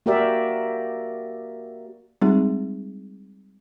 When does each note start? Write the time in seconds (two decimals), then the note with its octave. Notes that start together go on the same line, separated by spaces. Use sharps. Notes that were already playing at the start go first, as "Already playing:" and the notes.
0.06 A#3 F#4 G4 A#4 D5 E5
2.22 G3 G#3 C4 D#4 F4 G#4